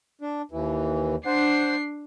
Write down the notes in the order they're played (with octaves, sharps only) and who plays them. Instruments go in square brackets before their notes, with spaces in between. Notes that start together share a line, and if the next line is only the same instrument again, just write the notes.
[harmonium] D4
D#2 E3
[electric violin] D4 C7 [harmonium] C5 F#5